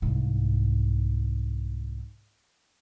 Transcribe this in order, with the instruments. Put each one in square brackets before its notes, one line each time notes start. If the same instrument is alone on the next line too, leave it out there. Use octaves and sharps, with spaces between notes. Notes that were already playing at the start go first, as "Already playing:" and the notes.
[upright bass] C2 G#2